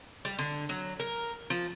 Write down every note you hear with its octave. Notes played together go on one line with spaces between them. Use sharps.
G3
D3
F#3
A#4
F3